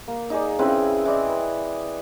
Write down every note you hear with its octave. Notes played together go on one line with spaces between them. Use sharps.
A#3
D#4 G#4 D5
C#3 C4 E4 B4
E3 D5 D#5
B4